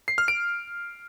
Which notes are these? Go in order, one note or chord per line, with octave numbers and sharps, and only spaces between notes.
C7
F6
D7